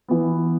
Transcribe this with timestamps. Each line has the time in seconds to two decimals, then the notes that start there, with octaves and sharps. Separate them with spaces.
0.08 E3 B3